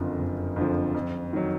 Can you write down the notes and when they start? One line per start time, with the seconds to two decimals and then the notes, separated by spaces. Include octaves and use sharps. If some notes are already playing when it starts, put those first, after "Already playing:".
Already playing: F#1 F2 D3 F3 A#4
0.19 F#1
0.56 F2 D3 F3
0.95 F2
1.33 D#3 F#3